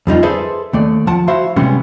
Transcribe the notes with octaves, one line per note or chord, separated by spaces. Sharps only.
F2 G3 D#4 F4
G#4 A4 B4 C5 D5 E5
D#2 A3 D5
F3 F#5 A5
E4 F#4 C5 E5 F5
C3 E3 G3 G#3 B3 C#4